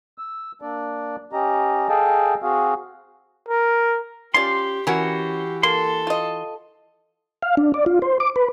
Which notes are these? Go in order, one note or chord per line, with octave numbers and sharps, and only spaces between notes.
E6
A#3 D4 D5
C#4 G4 D#5 A#5
G#4 A4 D#5 F5 G5 A5
C4 F#4 G#4 F5
A#4
C#4 F4 G4 D5 C6
E3 C#4 F#4 G4 A#4
A#3 A4 C6
F4 D#5
F5
D4
D5
F4
C5
D6
B4